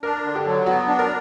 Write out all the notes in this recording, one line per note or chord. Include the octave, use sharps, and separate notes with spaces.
D4 A#4
D3
G4
F#3
B3 F#4
D4
A#4